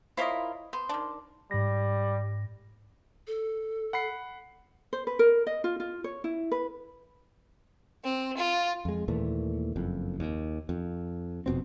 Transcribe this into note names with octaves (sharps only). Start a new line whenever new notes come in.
E4 F4 A#4 C5 C#5 D#5
B3 C5
D#3 D4
G#2 G3 A#6
A4
F#5 B5 C7
C5
B4
A#4
D#5
F4
F4
C#5
E4
B4
C4
F4
F2 G#3
D#2 A#2 E3 A3
F#1 F2
D#2
F2
F1 F2 B2 C4